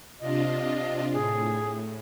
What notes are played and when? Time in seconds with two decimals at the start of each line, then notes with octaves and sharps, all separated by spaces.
0.20 C3 D4 F4 D#5
1.13 A2 G#4